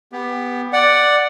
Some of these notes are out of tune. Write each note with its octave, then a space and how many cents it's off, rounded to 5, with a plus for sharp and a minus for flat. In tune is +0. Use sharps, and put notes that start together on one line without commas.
B3 +0 G4 +20
D5 +5 F#5 +0